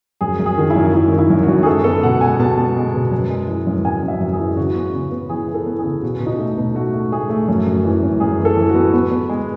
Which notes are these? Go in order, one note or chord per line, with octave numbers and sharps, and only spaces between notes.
F#2 G#4
F#2
G#4
D#3
E4
F#2
F#2 E4
D#3
E4
F#2
F#2 F#4
G#4
G#3 A4
B3 A4
B2 F#5
G#3 G#5
B2 A5
B3
G#3
B2
F#2
G#3
E3
F#2
F#2 G#5
F#2 E5
F#2
G#4
E3
C#3 F#4
B3
C#3
B3
E3 G#4
E3
A4
B3
G#4
C#3
B2 F#4
B2
D#4
A3
B2
A3 F#4
A3
A3 G#4
A3
F#2
F#2
E3
F#2
F#2 G#4
E3
A4
E3
F#4
B3
B3
B3
G#3